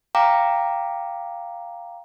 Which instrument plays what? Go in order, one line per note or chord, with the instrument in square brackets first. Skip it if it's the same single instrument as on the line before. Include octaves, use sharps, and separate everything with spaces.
[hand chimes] F5 G5 A#5 D6